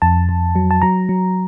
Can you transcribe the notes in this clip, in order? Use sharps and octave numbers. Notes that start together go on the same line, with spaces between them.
F2 A5
F2
F#3
A5
F#3 A#5
F#3